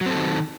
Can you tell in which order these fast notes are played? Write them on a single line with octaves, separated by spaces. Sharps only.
F#3 C4 A4 D#3